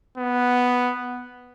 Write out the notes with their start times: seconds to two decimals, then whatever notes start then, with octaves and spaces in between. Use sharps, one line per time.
0.18 B3